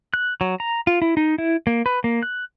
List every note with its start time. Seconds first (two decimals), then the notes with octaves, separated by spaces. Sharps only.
0.14 F#6
0.41 F#3
0.60 A#5
0.87 F4
1.02 E4
1.17 D#4
1.38 E4
1.67 A#3
1.86 B4
2.04 A#3
2.23 F#6